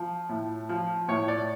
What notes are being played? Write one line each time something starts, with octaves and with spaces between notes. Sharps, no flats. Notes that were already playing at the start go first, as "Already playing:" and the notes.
Already playing: F3
A2
F3
A2 C#5
D5